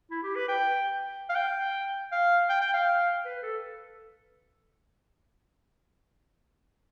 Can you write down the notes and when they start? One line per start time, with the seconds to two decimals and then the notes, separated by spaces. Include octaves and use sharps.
0.11 E4
0.24 G4
0.35 B4
0.49 G5
1.29 F5
1.36 G5
2.12 F5
2.50 G5
2.61 G5
2.74 F5
3.25 B4
3.43 A4